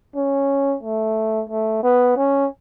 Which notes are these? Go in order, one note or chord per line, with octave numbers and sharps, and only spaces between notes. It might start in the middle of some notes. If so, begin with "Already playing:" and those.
C#4
A3
A3
B3
C#4